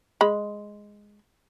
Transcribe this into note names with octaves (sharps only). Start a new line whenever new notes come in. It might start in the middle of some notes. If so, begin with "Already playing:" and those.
G#3 B5